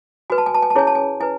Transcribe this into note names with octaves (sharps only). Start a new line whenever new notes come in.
F#4 B4 G#5
A5
G#5
A5
G#5
A5
C#4 E4 G#4 C#5 G#5
A5
G#5
E4 B4 G#5